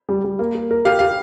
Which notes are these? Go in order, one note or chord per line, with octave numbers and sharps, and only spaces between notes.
G3
G3
A#3
A#4
A#4
G4 F5
G4 F5